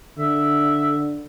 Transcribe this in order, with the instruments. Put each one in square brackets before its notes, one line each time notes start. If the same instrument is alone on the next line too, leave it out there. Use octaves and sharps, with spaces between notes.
[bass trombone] D3 [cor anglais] E5